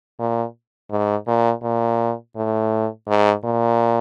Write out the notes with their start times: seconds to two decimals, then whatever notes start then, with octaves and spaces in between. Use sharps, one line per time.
0.19 A#2
0.91 G#2
1.27 A#2
1.63 A#2
2.36 A2
3.08 G#2
3.44 A#2